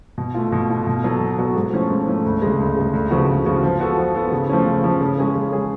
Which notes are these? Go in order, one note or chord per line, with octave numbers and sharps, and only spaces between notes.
B2
A3 F4
B2
A3 F4
B2
F#3 B3 F#4 A4
B2
F#3 B3 F#4 A4
G#2
F3 A3 C#4
G#2
F3 A3 C#4
D2
C#3 G#3
D2
C#3 G#3
D2
C#3 F3 B3 F#4
D2
C#3 F3 B3 F#4
F3
B3 F#4 A4
F3
B3 F#4 A4
C#3
F3 A3 C#4
C#3
F3 A3 C#4
C#3
G#3 C#4 G#4
C#3
G#3 C#4 G#4